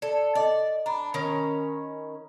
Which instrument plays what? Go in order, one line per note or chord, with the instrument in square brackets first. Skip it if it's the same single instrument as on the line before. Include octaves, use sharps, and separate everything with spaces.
[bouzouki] A4 [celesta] D5
[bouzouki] D5 [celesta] D#5
[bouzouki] D4 [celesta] A#5 B5
[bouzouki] D#3 C#4